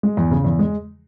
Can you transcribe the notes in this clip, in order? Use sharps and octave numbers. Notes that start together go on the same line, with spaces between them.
G#3
E2
C#3
E2
G#3